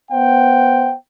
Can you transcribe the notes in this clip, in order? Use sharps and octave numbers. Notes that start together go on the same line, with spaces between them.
B3 C5 F#5 G5